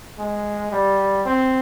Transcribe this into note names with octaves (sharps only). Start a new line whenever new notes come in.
G#3
G3
C4